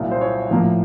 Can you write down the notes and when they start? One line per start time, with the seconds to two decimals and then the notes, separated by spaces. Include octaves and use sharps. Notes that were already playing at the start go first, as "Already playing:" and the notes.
Already playing: C2 A#2 F#3 A#3
0.11 C5
0.21 C#5
0.51 A2 F3 A#3